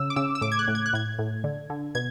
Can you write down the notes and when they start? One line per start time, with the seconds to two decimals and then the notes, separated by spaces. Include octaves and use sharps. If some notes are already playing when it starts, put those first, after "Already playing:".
Already playing: C#3 E6
0.10 D6
0.16 C#3 E6
0.35 E6
0.41 A2 D6
0.52 G#6
0.59 F#6
0.68 A2
0.75 G#6
0.86 F#6
0.93 A2 G#6
1.19 A2
1.44 D3
1.70 D3
1.95 B2 G#6